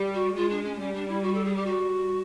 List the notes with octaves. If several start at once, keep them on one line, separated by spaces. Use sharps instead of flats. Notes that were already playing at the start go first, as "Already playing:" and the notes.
Already playing: G3
F#4
G#3 F4
D4
C#4
D4
G3 C#4
D4
E4
F#4
A4
G#4
G4
F#4